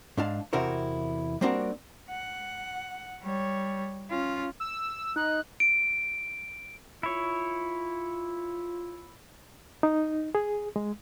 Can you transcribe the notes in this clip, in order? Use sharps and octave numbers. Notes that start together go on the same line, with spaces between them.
G#2 D4 F5 A5
E2 C3 E4 F#4 A#4 C5
G3 A#3 C4 D4 F#4 A#4
F#5
G3 C#5
C#4 F4
E6
D#4 F#6
D7
E4 F4 C#5
D#4
G#4
G#3